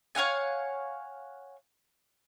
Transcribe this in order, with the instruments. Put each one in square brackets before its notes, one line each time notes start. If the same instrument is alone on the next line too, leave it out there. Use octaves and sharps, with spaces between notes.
[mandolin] C#5 F5 F#5 G#5